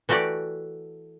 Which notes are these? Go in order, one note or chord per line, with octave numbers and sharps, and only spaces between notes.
E3 A3 F#4 G4 D5